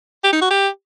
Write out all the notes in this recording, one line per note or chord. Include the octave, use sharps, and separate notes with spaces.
G4
D#4
F#4
G4